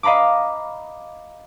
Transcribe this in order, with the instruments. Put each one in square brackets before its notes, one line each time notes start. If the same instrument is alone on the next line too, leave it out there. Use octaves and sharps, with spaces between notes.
[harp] D#5 F5 A#5 B5 D6